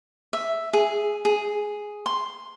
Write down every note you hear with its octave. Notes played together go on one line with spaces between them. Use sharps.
E5
G#4
G#4
C6